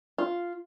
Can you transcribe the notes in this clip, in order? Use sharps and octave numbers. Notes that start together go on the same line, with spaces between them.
F4